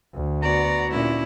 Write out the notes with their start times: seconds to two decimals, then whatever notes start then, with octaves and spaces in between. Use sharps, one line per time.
0.14 D2
0.43 B3 F#4 D5 A#5
0.90 A#2 C#4 D4 E4